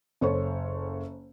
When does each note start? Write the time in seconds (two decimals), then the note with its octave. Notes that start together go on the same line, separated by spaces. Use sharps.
0.21 F#1 A4 C5 C#5 C#6